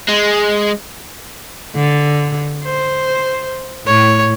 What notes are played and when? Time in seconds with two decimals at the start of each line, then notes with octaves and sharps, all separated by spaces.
0.09 G#3
1.75 D3
2.64 C5
3.86 A2 C#5